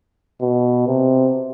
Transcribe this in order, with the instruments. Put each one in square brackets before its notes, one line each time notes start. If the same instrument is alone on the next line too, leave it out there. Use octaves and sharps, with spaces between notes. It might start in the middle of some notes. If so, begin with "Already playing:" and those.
[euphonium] B2
C3